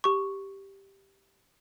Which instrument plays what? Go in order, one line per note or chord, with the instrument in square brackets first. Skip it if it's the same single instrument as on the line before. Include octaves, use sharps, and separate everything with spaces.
[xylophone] G4 C#6